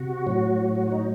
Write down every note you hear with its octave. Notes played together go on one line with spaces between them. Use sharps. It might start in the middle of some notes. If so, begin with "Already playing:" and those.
Already playing: C3 F#4
A2 F#3
F#4
F#4
D#4